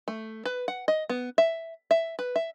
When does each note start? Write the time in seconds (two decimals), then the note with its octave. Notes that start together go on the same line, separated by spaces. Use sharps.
0.08 A3
0.45 B4
0.68 F#5
0.88 D#5
1.09 B3
1.38 E5
1.91 E5
2.19 B4
2.36 E5